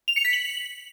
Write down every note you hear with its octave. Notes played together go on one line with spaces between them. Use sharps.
F7
C#7
B6
F#7